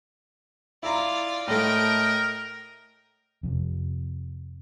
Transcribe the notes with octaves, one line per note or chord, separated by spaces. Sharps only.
E4 F4 D5 A#5
A2 A3 A#4 D#5 G5
F2 C3